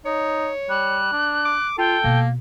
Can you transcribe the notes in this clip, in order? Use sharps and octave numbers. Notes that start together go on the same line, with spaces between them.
D#4 C#5
G3 F#6
D4
D6
F4 A4 G5
B2 A#3 B3